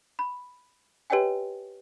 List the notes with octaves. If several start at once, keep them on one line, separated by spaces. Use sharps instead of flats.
B5
G4 B4 C#5 D#5 G5 G#5